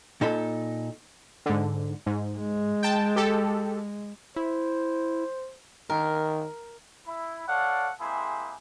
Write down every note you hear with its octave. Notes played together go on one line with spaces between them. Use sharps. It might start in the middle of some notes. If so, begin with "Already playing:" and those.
A#2 D#4 A4 B5
G#2 D3
G#2
G#3
G5 A5
G4 A4
E4 C5
D#3 A#4
E4
A4 C#5 D5 F5 F#5
G#3 A#3 C4 E4 G4 G#4